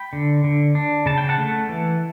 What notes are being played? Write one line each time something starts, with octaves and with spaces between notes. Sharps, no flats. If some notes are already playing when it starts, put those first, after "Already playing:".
Already playing: G5 B5
D3
D3
D4
C#3 A5
G5
F#5 A5
A3
E3